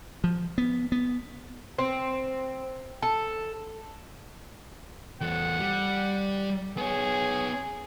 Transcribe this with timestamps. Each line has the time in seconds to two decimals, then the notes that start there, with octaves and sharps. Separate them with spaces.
0.24 F3
0.58 B3
0.92 B3
1.78 C4
3.03 A4
5.21 E2 A4 F#5
5.59 G3
6.77 B3 G#4 C#5